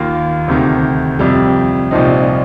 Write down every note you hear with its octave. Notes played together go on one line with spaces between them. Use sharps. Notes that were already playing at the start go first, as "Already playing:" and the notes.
Already playing: D#2 D#3 A#3 F4
D2 C3 D#3
F2 C3 G3
C2 A#2 F3 C4 D#4